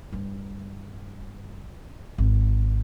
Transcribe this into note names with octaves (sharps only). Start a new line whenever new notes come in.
G2 G3
G#1